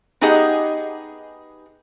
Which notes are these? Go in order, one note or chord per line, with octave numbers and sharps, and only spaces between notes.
B3 D#4 G4 G#4 D#5 F#5